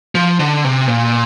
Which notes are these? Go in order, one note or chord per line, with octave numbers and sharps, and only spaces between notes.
F3
D3
C3
A#2